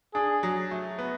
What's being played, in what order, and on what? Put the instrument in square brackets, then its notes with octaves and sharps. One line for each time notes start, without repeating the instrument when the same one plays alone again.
[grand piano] D4 [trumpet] G#4
[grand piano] F#3
A3
B3